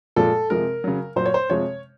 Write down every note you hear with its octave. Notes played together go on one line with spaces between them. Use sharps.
A#2 F3 G#3 A4
C3 F3 G#3 A#4
C#3 F#3
A#2 F#3 C5
C#5
C5
C3 F3 G#3 C#5